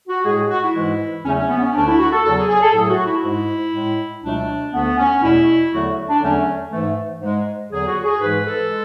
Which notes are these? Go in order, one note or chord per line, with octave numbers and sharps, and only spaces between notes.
F#4
A2 G#3 G#4
F#4
E4
G#2 E3 G#3
E2 C#3 F#3 A3 C#4
C#4
B3
C#4
D2 D3 A3 D4
E4
F#4
A4
E2 C#3 F#3 A4
G#4
G#4
A4
A2 F#3 A3 G#4
F#4
E4
G#2 G#3
A2 G#3
C#2 B2 F#3 A3 D4
D2 D3 A3 B3
C#4
E2 B2 A3 E4
E2 D3 F#3 A3 F#4
D4
E2 D3 F#3 A3 C#4
G#2 E3 A3
G#2 G#3
E2 D3 F#3 G#4
F#4
G#4
G#2 E3 G#3 B4
A4
G#3